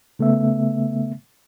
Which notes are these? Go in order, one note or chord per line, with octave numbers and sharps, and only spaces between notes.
C#3 A3 B3 E5